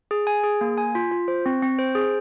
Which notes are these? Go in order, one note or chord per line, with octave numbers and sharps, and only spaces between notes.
G#4
G#5
G#4
A#3
G#5
F4
F4
C5
C4
C4
C5
G#4